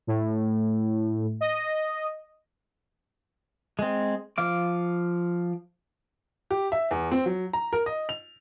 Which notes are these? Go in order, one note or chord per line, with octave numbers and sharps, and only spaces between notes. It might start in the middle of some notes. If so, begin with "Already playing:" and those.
A2
D#5
G#3 C4
F3 F5 D6
G4
E5
E2
C4
F#3
A#5
A#4
D#5
F7